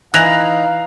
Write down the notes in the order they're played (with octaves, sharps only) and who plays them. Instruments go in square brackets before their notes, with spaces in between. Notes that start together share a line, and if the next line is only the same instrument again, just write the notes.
[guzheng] E3 [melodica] D#4 [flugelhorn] F5 [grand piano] F#6 A#6 F7